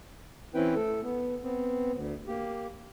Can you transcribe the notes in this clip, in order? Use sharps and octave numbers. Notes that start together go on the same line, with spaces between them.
E3 C4 C#4 E4 B4 G5
A3 A4
B3
B3 C4
D2
A#3 G4